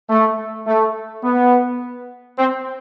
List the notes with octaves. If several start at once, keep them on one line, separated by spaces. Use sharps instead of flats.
A3
A3
B3
C4